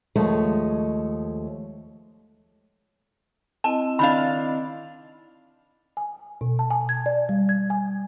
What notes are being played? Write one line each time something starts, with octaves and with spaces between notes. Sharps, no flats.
D#2 F3 G#3 A3 C#5
C4 E4 D#5 A5
D#3 D4 F5 B5
G#5
B2
A5
G#5
G#6
D5
G3
G#6
G#5